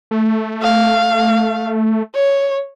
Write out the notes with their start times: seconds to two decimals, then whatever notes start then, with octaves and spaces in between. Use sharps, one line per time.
0.11 A3
0.62 F5
2.15 C#5